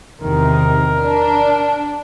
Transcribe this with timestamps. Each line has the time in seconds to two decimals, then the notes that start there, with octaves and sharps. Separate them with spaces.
0.21 E2 C3 D#3 A#4
1.00 D4